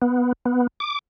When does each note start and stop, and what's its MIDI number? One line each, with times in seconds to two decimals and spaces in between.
0.02 0.33 59
0.46 0.67 59
0.80 0.99 86